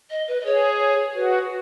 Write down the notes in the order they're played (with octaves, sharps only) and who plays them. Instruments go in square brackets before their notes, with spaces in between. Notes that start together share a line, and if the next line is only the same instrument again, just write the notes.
[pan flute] D#5
B4
D#5
[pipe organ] G#4 [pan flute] C#5
[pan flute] C#5
[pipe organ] F#4 [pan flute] B4